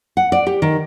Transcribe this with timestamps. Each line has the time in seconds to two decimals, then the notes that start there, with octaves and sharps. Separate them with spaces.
0.17 F#5
0.32 D5
0.47 G4
0.62 D#3